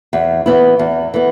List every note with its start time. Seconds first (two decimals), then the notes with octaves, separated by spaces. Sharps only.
0.13 E2
0.46 E3 B3 E4
0.79 E2
1.14 E3 B3